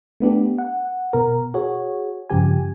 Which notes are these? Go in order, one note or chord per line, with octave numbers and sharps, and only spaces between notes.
A3 B3 D4 G4
F#5
B2 A#4
F#4 G#4 C#5
G2 C#3 F3 G4 G#5